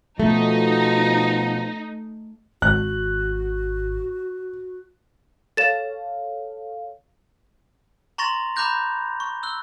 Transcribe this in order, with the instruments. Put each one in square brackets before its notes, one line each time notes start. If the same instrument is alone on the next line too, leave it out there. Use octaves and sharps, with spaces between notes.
[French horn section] B2 F3 [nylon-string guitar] A3 [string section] D#4
[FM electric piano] G#1 [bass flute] F#4 [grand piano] F#6
[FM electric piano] A4 C#5 F5 [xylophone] A6 E7
[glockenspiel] A#5 C6 C#6 A6 A#6 F7
A#5 B5 D6 F#6 G6 A#6
C#6
E6 F#6 G7